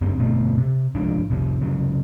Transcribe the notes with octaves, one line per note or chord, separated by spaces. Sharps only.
F#1 G2 G3 C4
G1 B2 A3 C4
C3
C2 G#2 F3 D4
F1 C2 C3
C2 C#3 F#3